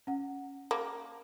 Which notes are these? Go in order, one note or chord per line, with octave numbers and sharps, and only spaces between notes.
C#4 F#5
A#3